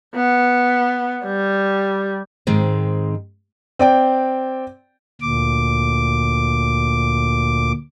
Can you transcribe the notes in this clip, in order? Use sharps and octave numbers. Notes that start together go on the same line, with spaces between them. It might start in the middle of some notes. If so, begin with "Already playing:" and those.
B3
G3
G#2 D#3 G#3 C4
C4 D5 G5
D2 A#2 D6